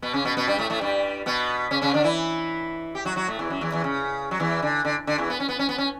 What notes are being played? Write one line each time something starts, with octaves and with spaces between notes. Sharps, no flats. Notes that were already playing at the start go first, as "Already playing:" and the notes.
B2 B3
C#3 C#4
B2 B3
B2 B3
G2 G3
A2 A3
A2 A3
G2 G3
B2 B3
C#3 C#4
C#3 C#4
D3 D4
E3 E4
G4
F#3 F#4
F#3 F#4
A2 A3
E2 E3
F#2 F#3
E2 E3
E2 E3
C#3
F#3
E2 E3
D3
D3
D3
E2 E3
B3
C#4
B3
C#4
B3
C#4